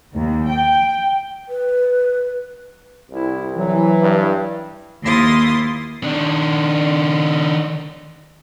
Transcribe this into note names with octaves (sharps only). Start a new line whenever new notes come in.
D#2
G5
B4
C2 E4
E3 F#3
G2
D#2 A#3 E4 C6 D#6 A6
D#3 D4